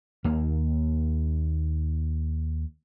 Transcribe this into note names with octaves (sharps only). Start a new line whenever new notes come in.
D#2 A#3